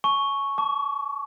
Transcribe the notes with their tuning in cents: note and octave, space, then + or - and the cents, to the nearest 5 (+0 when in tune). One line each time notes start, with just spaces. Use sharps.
G#5 +45 C#6 +0
A5 +0 C#6 +45